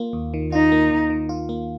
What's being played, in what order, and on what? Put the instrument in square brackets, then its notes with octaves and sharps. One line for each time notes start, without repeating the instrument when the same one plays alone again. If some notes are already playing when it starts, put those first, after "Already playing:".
Already playing: [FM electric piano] A#3 F4
D#2
D#3
[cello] D#4 [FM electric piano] F4
[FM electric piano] A#3
D#2
D#3
F4
A#3